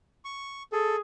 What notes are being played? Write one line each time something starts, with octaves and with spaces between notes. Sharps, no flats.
C#6
G#4 A4